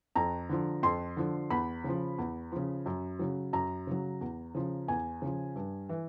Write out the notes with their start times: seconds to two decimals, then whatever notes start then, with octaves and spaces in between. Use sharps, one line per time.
0.16 F2 A#5
0.49 D3 F3
0.83 F2 C6
1.17 D3 F3
1.50 E2 B5
1.84 C#3 F3
2.18 E2
2.52 C#3 F3
2.86 F#2
3.19 C#3 F#3
3.53 F#2 A#5
3.87 C#3 F#3
4.21 E2
4.55 C#3 F3
4.88 E2 G#5
5.22 C#3 F3
5.56 G2
5.89 E3